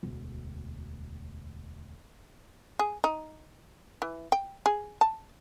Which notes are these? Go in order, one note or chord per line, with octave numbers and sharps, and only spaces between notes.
E1 D2
G#4
D#4
E3
G5
G#4
A5